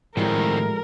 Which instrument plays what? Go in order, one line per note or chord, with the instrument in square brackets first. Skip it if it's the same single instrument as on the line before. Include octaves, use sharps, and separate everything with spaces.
[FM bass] A2 [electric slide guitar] D#3 C4 [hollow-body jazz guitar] F3 G3 G#3 [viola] A#4